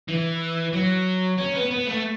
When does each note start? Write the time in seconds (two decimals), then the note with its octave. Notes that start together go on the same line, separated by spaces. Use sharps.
0.08 E3
0.73 F#3
1.38 C#4
1.55 B3
1.71 B3
1.87 A3